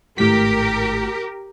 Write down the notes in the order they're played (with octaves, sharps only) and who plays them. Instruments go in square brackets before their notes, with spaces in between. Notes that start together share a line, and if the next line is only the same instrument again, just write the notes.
[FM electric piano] G#1 A2 B6 [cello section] G4 A#4